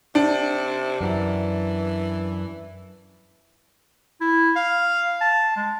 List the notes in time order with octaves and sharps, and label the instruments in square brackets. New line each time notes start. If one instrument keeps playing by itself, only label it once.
[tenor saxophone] C3 [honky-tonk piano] D4
[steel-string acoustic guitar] F#2 [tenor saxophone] E3
[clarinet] E4
F5
A5
G#3